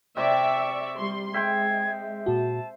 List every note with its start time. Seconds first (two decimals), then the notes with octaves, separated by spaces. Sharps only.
0.17 C3 D5 E5 C#6
0.98 G3 C6
1.34 G#3 E5 G5 C6 G#6
2.26 A#2 F#4 A5